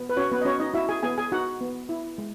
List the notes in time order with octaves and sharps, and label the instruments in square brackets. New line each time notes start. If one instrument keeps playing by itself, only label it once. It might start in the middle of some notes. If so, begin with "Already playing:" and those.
Already playing: [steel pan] B3
B4
C#4 F#4 C#5
B3 B4
D#5
C#4 F#4 C#5
D#4 D#5
E4 F#4 E5
G#4 G#5
B3 G#4 G#5
G#4 G#5
D#4 F#4 F#5
B3
E4
G#3